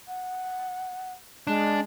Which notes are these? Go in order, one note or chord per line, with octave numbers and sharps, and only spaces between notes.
F#5
G#3 D4